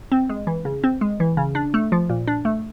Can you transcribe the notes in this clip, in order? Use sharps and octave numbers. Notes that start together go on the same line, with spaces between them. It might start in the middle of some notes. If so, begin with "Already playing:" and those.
C4
G#3
E3
C#3
C4
G#3
E3
C#3
D4
A3
F3
A#2
D4
A3